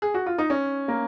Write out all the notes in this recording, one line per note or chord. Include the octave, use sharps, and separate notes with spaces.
G#4
F#4
F4
D#4
C#4
A#3